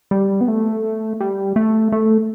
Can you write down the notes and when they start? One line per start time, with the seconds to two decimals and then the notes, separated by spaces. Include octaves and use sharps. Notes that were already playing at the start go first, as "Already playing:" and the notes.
0.11 G3
0.41 B3
0.48 A3
1.20 G3
1.56 A3
1.92 A3